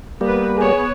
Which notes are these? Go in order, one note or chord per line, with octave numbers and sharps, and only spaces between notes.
G3 A#3 B3 B4
B3 G#4 C#5